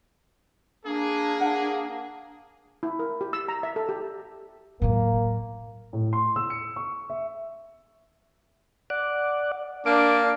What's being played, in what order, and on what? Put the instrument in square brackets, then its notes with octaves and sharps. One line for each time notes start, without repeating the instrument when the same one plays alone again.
[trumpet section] A#3 G#4 [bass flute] D4
[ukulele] F#5
[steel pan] E4
A#4
G4
E6
A#5
E5
A4
G4
[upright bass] A2 F#3 [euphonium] A#3
[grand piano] A2
C6
E6
C#7
C#6
E5
[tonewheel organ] D5 F#5
[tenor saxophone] A#3 [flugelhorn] D4 [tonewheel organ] D6